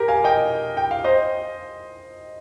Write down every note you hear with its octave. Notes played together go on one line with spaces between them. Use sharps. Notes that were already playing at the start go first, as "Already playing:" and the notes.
Already playing: G4 A#4
F5 G#5
D#5 G5
G5
F5
C5 D#5